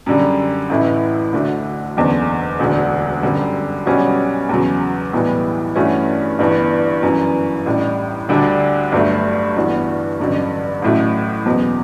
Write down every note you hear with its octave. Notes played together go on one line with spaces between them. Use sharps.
F#2 D3 G3
A1 A2 E3 A3 E4
D2 D3 A3 D4 F#4
F#1 E2 D3
E1 D2 D3
G1 F#2 D3 G3
B1 B2 G3 C#4 F#4
E2 C#3 F#3
B1 A2 E3 G3 B3
G2 E3 A3 C#4 F#4
G1 G2 E3 B3
G1 F#2 E3
A1 A2 G3 D4
D2 D3 G3 D4
G1 G2 F#3 A3
G1 G2 E3 B3 F#4
A1 G2 D3 F#3
A1 A2 F#3 A3
F#1 E2 B2 F#3